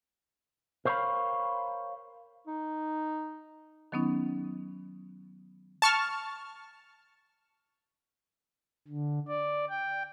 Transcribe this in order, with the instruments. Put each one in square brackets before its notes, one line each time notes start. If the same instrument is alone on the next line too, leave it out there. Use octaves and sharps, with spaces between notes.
[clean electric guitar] A#4 C5 C#5 E5 F5 B5
[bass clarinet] D#4
[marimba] D#3 F#3 B3 C#4 D#4
[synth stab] A5 C#6 F6
[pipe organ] D3
D5
G5